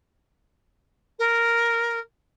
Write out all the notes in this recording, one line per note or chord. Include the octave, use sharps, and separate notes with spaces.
A#4